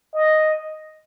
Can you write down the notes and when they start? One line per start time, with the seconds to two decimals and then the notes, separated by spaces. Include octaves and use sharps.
0.14 D#5